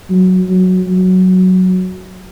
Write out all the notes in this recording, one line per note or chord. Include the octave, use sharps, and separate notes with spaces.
F#3
F#3
F#3